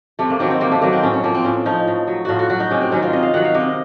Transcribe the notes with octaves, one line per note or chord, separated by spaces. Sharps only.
C3 A3
A#3
D#3 F#3 C4
C4
C3 A#3
A3
D#3 F#3 A#3
C4
A2 C#4
C#4
F3 A#3
C4
A2 C#4
F3 D#4
A2
F#3
A2 F4 F#4
F#4
F#3 F#4
D#4
C3 C#4
C4
D#3 F#3 C#4
F4
C3 D#5
F5
D#3 F#3 F#5
F5
C3 D#5